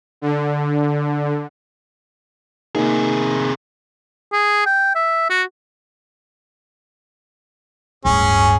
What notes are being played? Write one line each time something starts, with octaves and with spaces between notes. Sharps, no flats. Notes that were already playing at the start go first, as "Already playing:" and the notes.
D3
C3 A#3 D#4 G#4
G#4
G5
E5
F#4
D1 G2 C#4 G#4